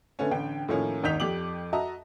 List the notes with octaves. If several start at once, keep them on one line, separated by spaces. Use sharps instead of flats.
D3 A3 B3 C#4
A1 D3 G5
A2 D#3 F3 A#3 C#4
G#1 D#2 D#4 G6 B6 F7
F2 G4 D6 F#7
F#4 D#5 E5 A5 A#5